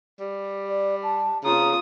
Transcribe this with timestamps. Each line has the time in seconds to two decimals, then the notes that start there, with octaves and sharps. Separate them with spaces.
0.20 G3
0.68 D5
1.03 A5
1.44 C#3 F4 A#5 D#6